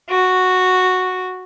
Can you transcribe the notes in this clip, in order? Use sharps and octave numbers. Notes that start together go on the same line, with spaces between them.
F#4